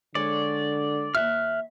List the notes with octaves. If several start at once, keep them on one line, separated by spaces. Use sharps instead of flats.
D3 G#3 C#5 D5
D#2 E5 F6 F#6